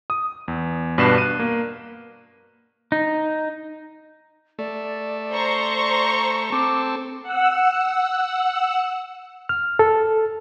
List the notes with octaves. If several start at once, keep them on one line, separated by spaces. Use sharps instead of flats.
D#6
E2
G2 B2 D4 B4 C7 E7
F#6 D#7
A#3
D#4
A3 D5
C5 A#5 C#6
C4 A4 D6
F#5 E6
F6
A4